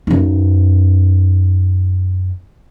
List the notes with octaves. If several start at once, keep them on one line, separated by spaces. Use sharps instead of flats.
F#2 D#4